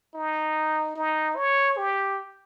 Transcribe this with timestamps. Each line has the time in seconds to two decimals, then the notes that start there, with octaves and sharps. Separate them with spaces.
0.14 D#4
0.96 D#4
1.37 C#5
1.78 G4